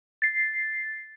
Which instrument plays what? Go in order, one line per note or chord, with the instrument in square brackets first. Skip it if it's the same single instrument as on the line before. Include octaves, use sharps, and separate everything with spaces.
[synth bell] A6 C7